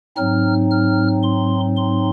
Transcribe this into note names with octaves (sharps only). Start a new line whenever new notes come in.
G#2 F#3 C4 D#4 F6
F6
C6
C6